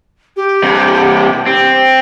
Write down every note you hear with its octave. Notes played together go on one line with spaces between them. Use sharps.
G4
G2 C3
C4